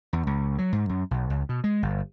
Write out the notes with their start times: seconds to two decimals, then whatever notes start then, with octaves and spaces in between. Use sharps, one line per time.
0.13 E2
0.27 C#2
0.58 F#3
0.73 G#2
0.89 F#2
1.11 B1
1.30 C#2
1.49 B2
1.64 G#3
1.83 G1